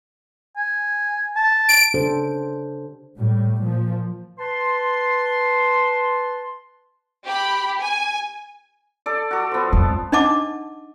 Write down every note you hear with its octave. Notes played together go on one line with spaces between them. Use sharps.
G#5
A5
D7
C#3 D4 G4 A4 C5
A2 G3
A#2 F3
B4 A5 C6
G4 B5
G#5
A4 D5
F#4 A4
F3 B3
F2 G#3
D4 D#4 D#5 F#5 A5 D6